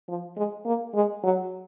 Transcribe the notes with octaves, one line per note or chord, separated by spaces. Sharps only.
F3
G#3
A#3
G#3
F#3